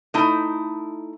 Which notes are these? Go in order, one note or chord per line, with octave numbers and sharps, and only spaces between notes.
A3 D#4 E4